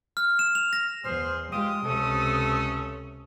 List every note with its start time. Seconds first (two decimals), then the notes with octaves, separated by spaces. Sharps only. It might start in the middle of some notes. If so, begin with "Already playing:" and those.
0.17 F6
0.39 E7
0.55 F7
0.73 A#6
1.04 E2 G#4 C5 F6
1.51 G#3 F4 G4 D#6
1.84 C#2 C3 A3 C#4 A4